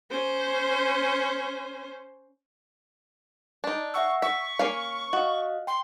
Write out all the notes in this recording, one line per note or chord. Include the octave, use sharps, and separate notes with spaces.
C#4 C5
D4 D#4
E5 F#5 C#6 E6
E5 C#6 B6
A#3 C#4 F5
F#4 D#5 F5
G5 C6